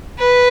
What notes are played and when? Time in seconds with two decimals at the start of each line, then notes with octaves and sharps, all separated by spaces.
0.19 B4